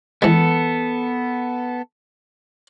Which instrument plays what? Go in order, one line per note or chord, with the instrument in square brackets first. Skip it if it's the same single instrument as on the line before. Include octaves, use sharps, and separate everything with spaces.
[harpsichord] E3 G#3 [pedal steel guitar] B3 A4